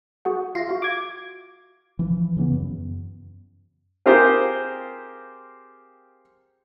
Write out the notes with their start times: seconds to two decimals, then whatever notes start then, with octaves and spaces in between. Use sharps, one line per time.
0.25 F#4 G#4 F#5
0.55 F4 E5 A#6 C7
0.69 F#4 F5
0.82 D6 G#6
1.99 E3 F3
2.37 C#3 E3 A#3 B3
2.52 F#2
4.06 C4 F4 G4 G#4 A#4 C5